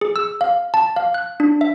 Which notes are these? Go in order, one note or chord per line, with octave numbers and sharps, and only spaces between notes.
G#4
E6
F5
A5
F5
F#6
D4
E5